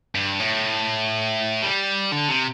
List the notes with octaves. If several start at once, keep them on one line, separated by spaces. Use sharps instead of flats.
G2
A2
G3
D3
C3